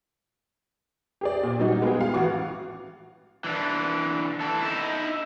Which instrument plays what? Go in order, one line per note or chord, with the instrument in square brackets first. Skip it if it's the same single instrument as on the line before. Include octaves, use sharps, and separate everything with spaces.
[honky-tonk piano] G4 G#4 D5
A#2
F#3 G3 D#4 F#4
G#3 B3 F4 G4 G#4
F5
A1 E3 F#4 D6
[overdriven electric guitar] E3 D4
E3 A4
D#4 E4